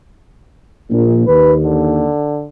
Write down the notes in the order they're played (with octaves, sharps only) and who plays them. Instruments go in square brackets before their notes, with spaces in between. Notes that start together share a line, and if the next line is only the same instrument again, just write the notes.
[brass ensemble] A#1 A#2
[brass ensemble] D#2 [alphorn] B4
[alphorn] D3